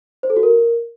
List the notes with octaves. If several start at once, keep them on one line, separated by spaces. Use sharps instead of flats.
C5
A4
F#4
A#4